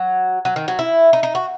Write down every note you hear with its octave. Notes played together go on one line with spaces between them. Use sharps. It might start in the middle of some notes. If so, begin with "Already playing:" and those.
Already playing: F#3
F#3
D#3
F#3
E4
D#4
D#4
F#4